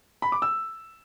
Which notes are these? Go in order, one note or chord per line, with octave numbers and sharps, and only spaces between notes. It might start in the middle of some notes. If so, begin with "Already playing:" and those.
B5
D6
E6